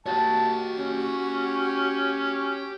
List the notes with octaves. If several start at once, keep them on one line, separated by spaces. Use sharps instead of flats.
F#4 G4 C#5 A5
C#4